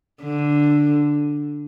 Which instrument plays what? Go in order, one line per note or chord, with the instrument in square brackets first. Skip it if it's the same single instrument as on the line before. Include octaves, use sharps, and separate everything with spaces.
[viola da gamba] D3